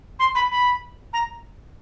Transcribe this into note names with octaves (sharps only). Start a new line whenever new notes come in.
C6
B5
B5
A#5